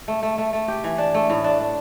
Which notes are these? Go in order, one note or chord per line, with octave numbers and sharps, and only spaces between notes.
A3
A3
A3
A3
G4
E3
D4
A3
A2
D4
D4